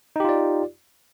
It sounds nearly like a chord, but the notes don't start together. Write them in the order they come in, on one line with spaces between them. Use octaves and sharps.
D#4 G4 F4 D5